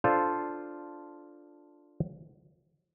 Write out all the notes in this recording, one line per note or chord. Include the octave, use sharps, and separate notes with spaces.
D4 F4 A4 C5 F5